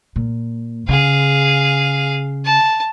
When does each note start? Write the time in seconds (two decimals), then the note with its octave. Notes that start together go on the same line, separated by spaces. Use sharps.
0.16 A#2
0.89 C#3 G#4 F5
2.45 A5